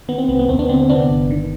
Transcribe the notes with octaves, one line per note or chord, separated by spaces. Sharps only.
D#3 B3
C4
C2 B3
B3
D#2 C4
B3 D4
D3 C4
C4
C3 B3 D4
G1
D#3